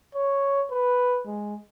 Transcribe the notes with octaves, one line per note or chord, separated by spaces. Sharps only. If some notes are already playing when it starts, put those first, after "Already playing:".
C#5
B4
G#3